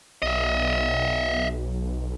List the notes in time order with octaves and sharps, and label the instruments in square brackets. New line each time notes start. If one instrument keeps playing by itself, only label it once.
[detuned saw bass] B1 [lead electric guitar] D#5 E5